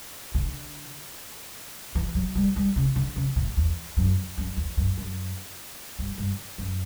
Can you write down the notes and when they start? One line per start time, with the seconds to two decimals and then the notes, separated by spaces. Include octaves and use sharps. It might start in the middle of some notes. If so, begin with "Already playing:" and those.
0.35 D3
1.95 E3
2.15 F#3
2.35 G3
2.56 G3
2.76 C#3
2.96 D3
3.16 C#3
3.36 A2
3.57 E2
3.97 F#2
4.38 F#2
4.57 E2
4.77 F#2
4.98 F#2
5.99 G2
6.18 G2
6.58 F#2